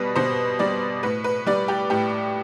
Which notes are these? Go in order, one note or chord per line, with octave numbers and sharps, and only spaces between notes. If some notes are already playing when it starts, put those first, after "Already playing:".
Already playing: B2 G3 B4
B2 C5
G3 D5
A2 B4
B4
G3 D5
G4
A2 G4